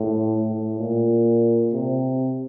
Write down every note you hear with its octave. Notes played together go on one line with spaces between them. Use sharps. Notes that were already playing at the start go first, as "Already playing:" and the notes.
Already playing: A2
A2
A#2
C3